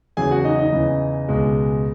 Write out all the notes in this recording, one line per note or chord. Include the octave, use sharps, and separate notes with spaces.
E2 C#3 F#3 G#4 G#5
F#4 F#5
D#4 D#5
D#4 D#5
E2 C#3 E3
C#2 B2 G#3